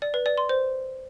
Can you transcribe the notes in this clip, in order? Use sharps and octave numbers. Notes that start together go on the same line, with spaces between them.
D5
B4
D5
C6
C5